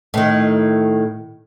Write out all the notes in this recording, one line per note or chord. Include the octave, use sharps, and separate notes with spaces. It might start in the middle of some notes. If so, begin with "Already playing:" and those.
A2 D#3